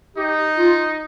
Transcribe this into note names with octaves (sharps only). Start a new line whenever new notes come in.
D#4 G4
F4